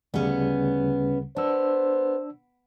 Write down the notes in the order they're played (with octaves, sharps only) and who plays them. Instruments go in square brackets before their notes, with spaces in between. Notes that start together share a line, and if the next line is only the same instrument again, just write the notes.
[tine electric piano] D2 C#3 G3 [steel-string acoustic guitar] B3 C#4
[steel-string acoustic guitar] B3 [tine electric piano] D4 E6 [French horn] C5